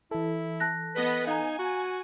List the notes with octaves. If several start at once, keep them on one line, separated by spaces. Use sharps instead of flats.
E3 E4 A4
A5 F#6 A#6
B3 B4 D#5
D#4 F5 G#5 A#5
F#4